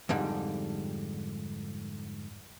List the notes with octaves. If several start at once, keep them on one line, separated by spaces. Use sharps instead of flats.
F2 G#2 D3 G3